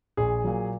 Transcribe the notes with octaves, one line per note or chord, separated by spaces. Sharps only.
A#1 G#4
A#2 F#3